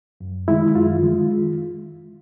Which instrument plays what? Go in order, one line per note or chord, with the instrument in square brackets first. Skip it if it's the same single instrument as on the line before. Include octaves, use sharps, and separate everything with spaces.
[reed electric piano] F#2
D#3 G#3 E4
F#2 F4
D#3 G#3